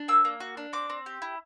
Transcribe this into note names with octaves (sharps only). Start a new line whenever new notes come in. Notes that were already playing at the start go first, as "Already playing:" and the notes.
Already playing: D4
A#3 E6
A#3
F#4
D4
C4 D6
C4
G4
E4